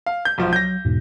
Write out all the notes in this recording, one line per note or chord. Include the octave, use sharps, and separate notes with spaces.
F5
G6
B1 F3 C5
F#3 G6 A#6
E2 G#2 B2